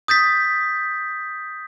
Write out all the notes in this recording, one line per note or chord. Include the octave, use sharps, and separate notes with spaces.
D#6 G6 A6 B6